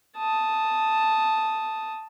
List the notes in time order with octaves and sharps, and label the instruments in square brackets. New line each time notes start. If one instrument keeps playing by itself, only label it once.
[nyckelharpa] A5 D#6